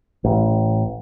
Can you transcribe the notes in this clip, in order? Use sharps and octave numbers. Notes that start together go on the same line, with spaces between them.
A1